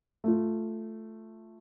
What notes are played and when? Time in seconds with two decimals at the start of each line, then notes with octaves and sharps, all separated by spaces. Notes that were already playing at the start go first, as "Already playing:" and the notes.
0.24 A3 F4